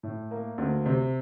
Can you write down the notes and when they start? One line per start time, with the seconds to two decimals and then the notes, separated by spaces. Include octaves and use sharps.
0.03 A2
0.31 A#3
0.58 D2
0.86 C3